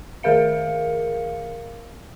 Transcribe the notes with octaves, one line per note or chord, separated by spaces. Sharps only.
D#3 G#4 A#4 F5 C#7